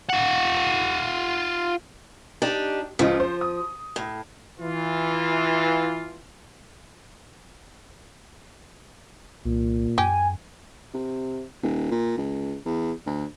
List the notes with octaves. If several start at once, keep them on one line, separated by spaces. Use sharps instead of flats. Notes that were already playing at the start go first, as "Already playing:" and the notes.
F4 F#5
D4 D#4 G4
C#2 F3 F4 D#5
C5
D#6
A2
E3 F4
C2 A#2
F#2 G4 G#5
C3
D#1
A#2
C#2
E2
D2